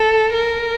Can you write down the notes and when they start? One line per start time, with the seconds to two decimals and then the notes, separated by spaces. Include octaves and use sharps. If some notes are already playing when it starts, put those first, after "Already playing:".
Already playing: A4
0.33 A#4